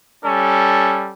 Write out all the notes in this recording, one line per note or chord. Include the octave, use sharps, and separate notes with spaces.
G3 C#4 A4